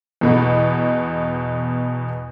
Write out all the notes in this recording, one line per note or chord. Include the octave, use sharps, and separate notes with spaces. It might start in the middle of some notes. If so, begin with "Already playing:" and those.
E2 B2 B3